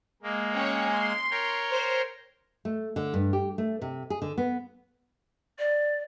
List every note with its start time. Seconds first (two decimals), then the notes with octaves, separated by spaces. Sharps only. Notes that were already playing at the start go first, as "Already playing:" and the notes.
0.23 G#3 A#3
0.54 C#4 C#5 G5
0.91 C6
1.31 A#4 C#5 G5
1.71 C5
2.65 A3
2.96 D3
3.14 G2
3.33 G4
3.58 A3
3.82 C3
4.10 G#4
4.22 D3
4.38 B3
5.58 D5